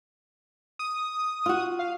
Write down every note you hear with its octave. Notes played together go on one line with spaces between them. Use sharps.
D#6
F4 F#4
F5